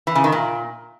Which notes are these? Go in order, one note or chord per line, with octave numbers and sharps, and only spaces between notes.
E3
C#3
D#3
A#2